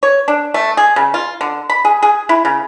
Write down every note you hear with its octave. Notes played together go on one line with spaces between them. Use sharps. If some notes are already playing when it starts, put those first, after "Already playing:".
C#5
D4
A3
G#4
C#3
F4
D3
B5
G#4
G#4
E4
C#3